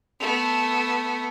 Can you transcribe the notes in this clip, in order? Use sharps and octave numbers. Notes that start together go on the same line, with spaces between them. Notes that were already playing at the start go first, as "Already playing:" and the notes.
A3 B3